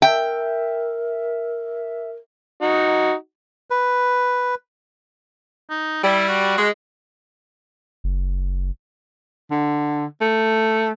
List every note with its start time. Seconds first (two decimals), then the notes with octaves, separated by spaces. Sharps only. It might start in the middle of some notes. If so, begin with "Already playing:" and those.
0.02 A#4 E5 G5
2.61 D#4 F#4
3.70 B4
5.70 D#4
6.04 G3 E4
6.29 F#4
6.58 G#3
8.04 F#1
9.51 D3
10.21 A3